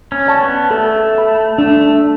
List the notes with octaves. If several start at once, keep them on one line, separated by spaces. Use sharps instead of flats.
C#4
D5 A5 C#6
B3
A3 A4
E5 B5
A3 D4